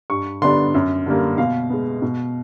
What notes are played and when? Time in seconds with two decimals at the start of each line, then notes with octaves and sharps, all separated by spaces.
0.10 G2 C#6
0.42 D3 G3 B3 D4 C6
0.74 F#2
1.06 D3 G3 A#3
1.38 B2 F5
1.70 G#3 B3
2.02 B2